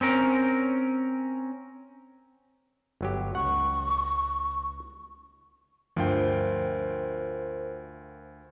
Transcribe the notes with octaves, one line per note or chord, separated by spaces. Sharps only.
C4 C#4 A#4
G1 F#3 G4
C#2 F#5 C#6
D2 G2 F3 F4 A#4 C5 G5